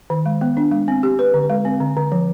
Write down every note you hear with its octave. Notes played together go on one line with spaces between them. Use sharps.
D#3
G#3
B3
D4
G#3
C4
G4
B4
D3
G#3
C4
D3
D3
F3